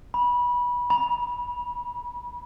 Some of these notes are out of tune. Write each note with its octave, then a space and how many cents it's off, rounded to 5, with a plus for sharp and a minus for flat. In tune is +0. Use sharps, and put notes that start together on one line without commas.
B5 -25
B5 -40